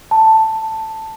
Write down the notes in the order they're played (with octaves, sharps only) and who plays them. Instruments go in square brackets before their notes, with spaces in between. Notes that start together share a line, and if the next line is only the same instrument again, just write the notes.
[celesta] A5